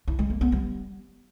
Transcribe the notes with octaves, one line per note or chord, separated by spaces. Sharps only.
E4
G#3
A#3
B3
G3